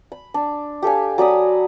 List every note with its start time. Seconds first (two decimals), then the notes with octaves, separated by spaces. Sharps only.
0.12 B5
0.34 D4
0.82 G4 A4 F5 G#5
1.18 F#3 D5 B5 D#6